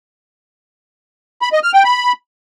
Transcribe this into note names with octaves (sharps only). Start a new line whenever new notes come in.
B5
D#5
F6
G5
B5